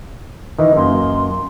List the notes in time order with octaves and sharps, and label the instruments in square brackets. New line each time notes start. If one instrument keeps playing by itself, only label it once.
[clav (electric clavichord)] D#3 E3 [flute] D#5
[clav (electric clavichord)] F#2 A#3 [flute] C6